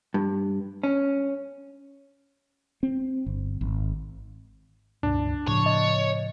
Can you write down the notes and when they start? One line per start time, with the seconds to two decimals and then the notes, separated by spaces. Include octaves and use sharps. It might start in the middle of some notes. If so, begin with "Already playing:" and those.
0.14 G2
0.83 C#4
2.83 C4
3.26 G1
3.61 G#1
5.03 C#2 G2 B2 D4
5.48 A2 C#3 F3 C#5
5.66 D#5